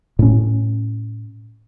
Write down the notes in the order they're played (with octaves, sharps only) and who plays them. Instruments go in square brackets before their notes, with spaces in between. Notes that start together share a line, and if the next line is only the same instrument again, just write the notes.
[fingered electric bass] A2 C#4